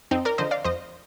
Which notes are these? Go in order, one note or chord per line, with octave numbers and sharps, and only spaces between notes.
F2 C4 D#4
A#4 D5
D3 F3 C5 D#5
D5 F5
F2 C5 D#5